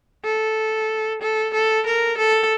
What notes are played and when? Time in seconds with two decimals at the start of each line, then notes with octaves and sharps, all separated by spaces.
0.25 A4
1.22 A4
1.54 A4
1.87 A#4
2.18 A4